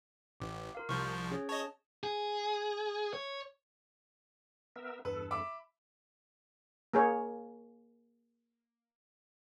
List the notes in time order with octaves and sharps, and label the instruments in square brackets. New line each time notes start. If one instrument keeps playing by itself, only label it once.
[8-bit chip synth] A1 [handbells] D6
[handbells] F4 A#4 F5
[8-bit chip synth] C2 F3 [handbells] C#6 F6 G6
[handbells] C#4 G#4 C#5
[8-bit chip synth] C#5 D#5 [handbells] A5
[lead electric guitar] G#4
C#5
[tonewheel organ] B3 A#4 E5
[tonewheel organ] E2 G2 A4 [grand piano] B4
[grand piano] E5 B5 D6
[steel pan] A#3 G#4 C#5